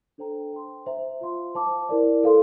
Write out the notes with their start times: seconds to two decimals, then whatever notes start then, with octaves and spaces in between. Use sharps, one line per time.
0.18 D4 A4 C5 G5 A#5
0.53 C5 G5 C6
0.86 C5 E5 A#5
1.21 F4 C5 F5 C6
1.55 C5 F5 A5 D6
1.89 E4 A#4 D5
2.24 A4 C5 F5 C6